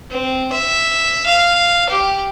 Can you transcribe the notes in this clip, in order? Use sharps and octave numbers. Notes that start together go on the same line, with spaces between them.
C4
E5
F5
G4